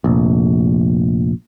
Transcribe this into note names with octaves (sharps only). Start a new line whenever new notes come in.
F1 A#1